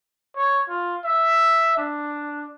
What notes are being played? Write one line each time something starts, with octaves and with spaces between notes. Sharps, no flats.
C#5
F4
E5
D4